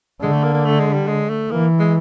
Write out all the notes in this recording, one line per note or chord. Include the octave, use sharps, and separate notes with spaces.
D3 G#3
A3
A#3
A#3
A3
G#3
G3
G#3
A3
E3 A#3
G#3